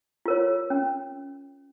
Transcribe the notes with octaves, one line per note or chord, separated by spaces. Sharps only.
F4 A#4 C#5
C#4